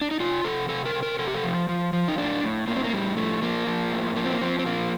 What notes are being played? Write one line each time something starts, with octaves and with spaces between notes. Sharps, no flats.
D4
D#4
C3 F4
C3 A4
C3 A4
A#4
C3
A#4
C3 A4
G4
A4
F3
F3
F3
D#4
A2 D4
A2
A2 A#3
C4
A#3
A2 G3
F3 A3
F3 A#3
F3
A2
F3 A#3
C4
A#3
F3 C4
C4
A#2 A#3